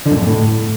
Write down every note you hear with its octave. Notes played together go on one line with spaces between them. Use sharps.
D3
F#2
A2
F#2
A2